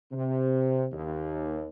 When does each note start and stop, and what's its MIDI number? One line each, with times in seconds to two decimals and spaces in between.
0.12 0.86 48
0.93 1.66 39